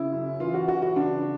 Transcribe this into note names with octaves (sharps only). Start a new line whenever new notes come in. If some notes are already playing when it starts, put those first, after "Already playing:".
Already playing: C#3 E4
F#2
E3 F4
F#4
E3 F#4
F#4
C#3 D4